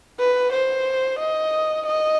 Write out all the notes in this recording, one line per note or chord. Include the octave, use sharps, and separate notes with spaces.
B4
C5
D#5
D#5